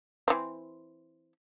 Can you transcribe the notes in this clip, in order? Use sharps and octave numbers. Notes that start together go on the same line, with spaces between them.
E3 C4